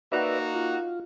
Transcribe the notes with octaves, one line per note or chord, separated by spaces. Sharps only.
A#3 D#4 F#4 B4 D5 E5
F4